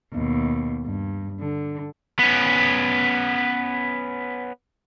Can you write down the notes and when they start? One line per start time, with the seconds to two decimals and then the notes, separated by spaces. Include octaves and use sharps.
0.13 D#2 B2
0.85 G2
1.40 D3
2.19 B3 C#4